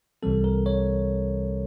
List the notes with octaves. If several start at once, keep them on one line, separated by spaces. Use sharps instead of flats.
C2 C3 E3 G3 C4 A4
A#4
C#5